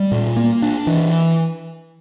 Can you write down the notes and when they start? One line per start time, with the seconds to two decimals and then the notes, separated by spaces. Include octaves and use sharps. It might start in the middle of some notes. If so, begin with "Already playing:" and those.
Already playing: G3
0.12 A#2
0.37 A#3
0.62 D4
0.87 E3